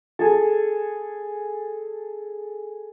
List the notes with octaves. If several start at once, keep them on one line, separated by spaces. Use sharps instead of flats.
G#4 A4